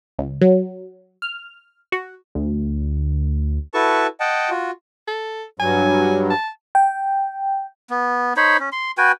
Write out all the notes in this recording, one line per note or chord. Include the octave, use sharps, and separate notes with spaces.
C#2
F#3
F6
F#4
D2
E4 F#4 A4 B4 A5 C#6
D#5 F#5 G5 A5
F4 F#4
A4
G2 F#3 G#5
A5
G5
B3
D#4 C5 C#5 B5
C#4
C6
F#4 B4 G5 G#5